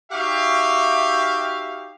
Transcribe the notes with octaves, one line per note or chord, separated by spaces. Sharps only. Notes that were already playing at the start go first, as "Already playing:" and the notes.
D#4 F#4 G4 E5 F5